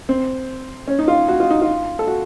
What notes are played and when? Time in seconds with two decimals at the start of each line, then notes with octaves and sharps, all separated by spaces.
0.09 C4
0.88 C#4
0.99 D#4
1.08 F4
1.28 F#4
1.40 F4
1.51 D#4
1.62 F4
1.99 A4
2.07 F#4